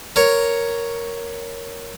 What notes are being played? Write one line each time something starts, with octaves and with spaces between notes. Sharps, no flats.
A#4 C#5